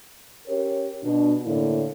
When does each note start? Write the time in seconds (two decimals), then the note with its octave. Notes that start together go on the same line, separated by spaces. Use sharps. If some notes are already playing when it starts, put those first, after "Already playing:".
0.48 C#4 G4 A#4 C#5
1.04 B2 D4
1.45 A2 D3 A#3 E4